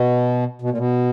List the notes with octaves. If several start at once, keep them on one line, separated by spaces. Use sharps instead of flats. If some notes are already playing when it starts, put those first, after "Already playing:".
Already playing: B2
B2
A#2
B2